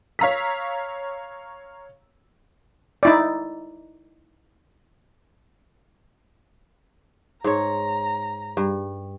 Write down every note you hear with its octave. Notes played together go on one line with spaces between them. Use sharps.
C#5 F5 A#5 E6 B6
D#4 E4 D5
G#2 C#5 A#5
G2